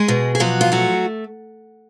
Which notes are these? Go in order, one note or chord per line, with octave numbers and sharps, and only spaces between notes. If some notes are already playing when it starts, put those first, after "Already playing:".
Already playing: G#3 G#4
B2
G#4
F3 F#3 F#4
F4
F#3 A3 F#4